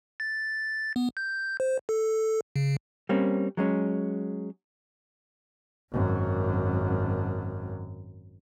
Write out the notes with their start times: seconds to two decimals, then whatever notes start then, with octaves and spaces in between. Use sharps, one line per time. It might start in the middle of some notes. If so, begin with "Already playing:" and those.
0.20 A6
0.96 B3
1.17 G6
1.60 C5
1.89 A4
2.56 C#3
3.09 G3 A#3 C4 C#4
3.57 F#3 G#3 C#4
5.91 G#1 F#2